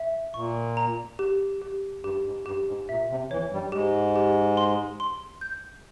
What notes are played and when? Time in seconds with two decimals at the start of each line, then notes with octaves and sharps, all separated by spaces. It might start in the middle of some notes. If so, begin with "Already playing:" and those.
Already playing: E5
0.34 A#2 C#6
0.77 A#5
1.19 G4
1.62 G4
2.03 G2 G4
2.25 G#2
2.45 G2 G4
2.67 G#2
2.89 A#2 E5
3.10 C3
3.31 E2 E3 C#5
3.52 G2 G3
3.72 G#2 G#3 G4
4.16 G4
4.57 C6
5.00 C6
5.41 G6